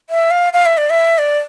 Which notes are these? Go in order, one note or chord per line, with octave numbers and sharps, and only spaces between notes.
E5
F5
F5
E5
D5
E5
D5